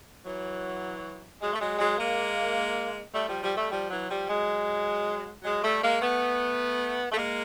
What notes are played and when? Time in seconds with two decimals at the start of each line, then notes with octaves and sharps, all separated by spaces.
0.25 E3 F#3
1.40 F#3 G#3
1.53 A3
1.59 F#3 G#3
1.78 F#3 G#3
1.98 G#3 A#3
3.13 G3 A3
3.27 F3 G3
3.42 F3 G3
3.56 G3 A3
3.71 F3 G3
3.90 E3 F#3
4.09 F3 G3
4.28 F#3 G#3
5.44 F#3 G#3
5.62 G3 A3
5.82 G#3 A#3
6.01 A3 B3
7.11 A3
7.17 G#3 A#3